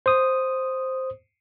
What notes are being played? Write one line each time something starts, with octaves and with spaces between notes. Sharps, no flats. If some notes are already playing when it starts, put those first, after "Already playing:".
C5 D#6